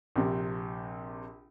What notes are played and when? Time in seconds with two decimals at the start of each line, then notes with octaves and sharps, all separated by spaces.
0.16 A#1 C3